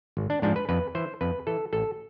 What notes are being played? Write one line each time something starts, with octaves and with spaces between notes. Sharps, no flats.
G#1
D4
G#2 F3 D4
B4
F2 B4
E3 C5
F2 B4
E3 A4
A1 A4